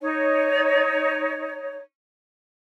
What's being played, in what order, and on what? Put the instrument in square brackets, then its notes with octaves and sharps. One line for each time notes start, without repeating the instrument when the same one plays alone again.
[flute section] D#4 C#5